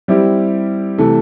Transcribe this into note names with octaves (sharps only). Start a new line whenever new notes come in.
G3 C4 E4 G4
C3 E3 A3